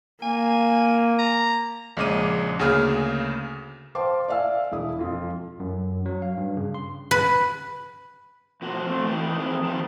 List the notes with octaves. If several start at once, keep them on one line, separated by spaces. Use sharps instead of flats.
A#3 G#5
A#5
A#1 C#3 G#3 D6 D#7
D2 C#3 A#3 G#4 F6
C5 F5 G5 A5 C6 D6
D5 E5 F5 G#5 E6
E1 E4 D#6
F2 F4
F#2
F#3
F5
G2
C#3
C6
B4
B2 F3 F#4
A3 C4
E3 D#4 B4 G5
F3 C4 D#4 G#4
F2 D#3 C4 B4 A5